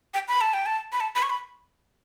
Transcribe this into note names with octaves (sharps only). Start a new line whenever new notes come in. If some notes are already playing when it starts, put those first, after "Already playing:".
G5
B5
A5
G5
A5
B5
A5
B5
C#6
B5